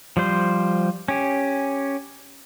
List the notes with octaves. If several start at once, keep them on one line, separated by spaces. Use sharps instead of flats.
F3 G3 C5
C#4 G4